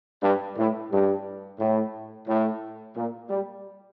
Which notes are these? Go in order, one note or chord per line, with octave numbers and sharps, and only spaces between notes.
G2
A2
G2
A2
A2
A#2
G3